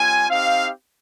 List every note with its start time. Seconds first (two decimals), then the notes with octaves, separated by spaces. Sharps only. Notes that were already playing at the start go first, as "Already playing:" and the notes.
Already playing: G3 C4 F4 G#5
0.29 C4 D#4 G4 F5